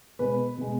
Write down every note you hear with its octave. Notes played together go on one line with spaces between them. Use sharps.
B2 G#3 B4
B2 G#3